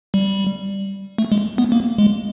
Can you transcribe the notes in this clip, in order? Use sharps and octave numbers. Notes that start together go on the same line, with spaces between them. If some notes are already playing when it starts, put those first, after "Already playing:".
G3
A3
G#3
B3
A#3
G#3